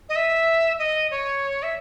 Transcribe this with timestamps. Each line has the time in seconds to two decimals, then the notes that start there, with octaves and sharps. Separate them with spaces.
0.09 D#5
0.16 E5
0.79 D#5
1.11 C#5
1.63 E5